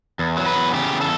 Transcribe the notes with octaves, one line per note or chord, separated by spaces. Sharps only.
E2
F#3
B4
E2
C#3 G4
E2
A4